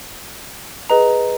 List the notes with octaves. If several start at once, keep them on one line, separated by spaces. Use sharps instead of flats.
G#4 B4 D#5 A#5